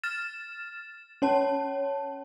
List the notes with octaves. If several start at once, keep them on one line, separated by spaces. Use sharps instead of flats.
F6 A6 E7
C#4 C#5 A5